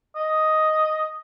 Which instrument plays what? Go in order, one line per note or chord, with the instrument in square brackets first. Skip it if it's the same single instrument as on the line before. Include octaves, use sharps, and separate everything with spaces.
[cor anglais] D#5